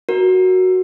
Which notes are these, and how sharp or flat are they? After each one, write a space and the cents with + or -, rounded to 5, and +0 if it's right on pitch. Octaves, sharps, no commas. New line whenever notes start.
F#4 +0 A#4 +5